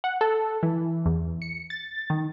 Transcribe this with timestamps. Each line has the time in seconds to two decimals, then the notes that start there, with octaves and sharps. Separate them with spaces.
0.04 F#5
0.21 A4
0.63 E3
1.06 E2
1.42 C#7
1.70 A6
2.10 D#3